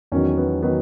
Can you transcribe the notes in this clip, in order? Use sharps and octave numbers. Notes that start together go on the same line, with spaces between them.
E2 D#3 F#3 C#4
B3
D#3 F#3 B3